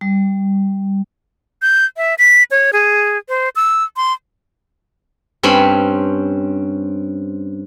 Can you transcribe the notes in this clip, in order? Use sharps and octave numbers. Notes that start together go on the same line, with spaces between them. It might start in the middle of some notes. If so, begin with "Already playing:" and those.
G3
G6
E5
B6
C#5
G#4
C5
E6
C6
G2 C4 C#4 B5